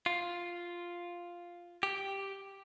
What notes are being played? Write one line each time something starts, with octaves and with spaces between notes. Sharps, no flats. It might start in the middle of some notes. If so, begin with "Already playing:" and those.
F4
G4